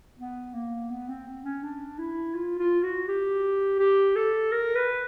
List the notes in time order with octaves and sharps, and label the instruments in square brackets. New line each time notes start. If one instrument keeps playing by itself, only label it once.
[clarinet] B3
A#3
B3
C4
C#4
D4
E4
F4
F4
F#4
G4
G4
A4
A#4
B4